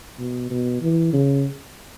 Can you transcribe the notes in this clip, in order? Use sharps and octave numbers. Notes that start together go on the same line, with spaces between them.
B2
B2
E3
C#3